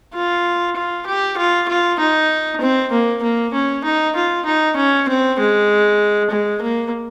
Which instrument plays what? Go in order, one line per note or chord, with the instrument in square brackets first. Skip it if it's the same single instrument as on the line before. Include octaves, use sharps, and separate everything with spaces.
[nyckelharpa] F4
F4
G4
F4
F4
D#4
C4
A#3
A#3
C#4
D#4
F4
D#4
C#4
C4
G#3
G#3
A#3